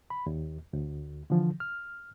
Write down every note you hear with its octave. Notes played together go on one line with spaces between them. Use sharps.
B5
D#2
D2
D3 E3 F3
F6